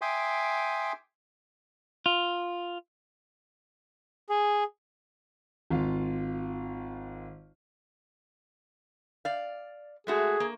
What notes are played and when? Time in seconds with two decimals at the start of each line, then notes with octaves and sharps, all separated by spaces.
0.02 E5 G5 G#5 C6 D6 D#6
2.06 F4
4.30 G#4
5.70 G#1 F4 F5
9.25 D5 F5
10.07 G#3 A3 F#4 G#4
10.40 A#3